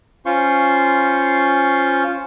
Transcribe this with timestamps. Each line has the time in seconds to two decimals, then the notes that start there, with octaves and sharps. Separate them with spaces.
0.26 C#4 F4 C5 F5 C6 C#6